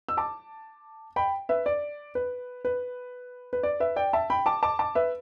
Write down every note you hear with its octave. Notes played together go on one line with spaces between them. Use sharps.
E6
A5 D6
G5 B5
B4 E5
D5
B4
B4
B4
D5
B4 E5
D5 G5
E5 A5
G5 B5
A5 D6
A5 D6
A5 D6
B4 E5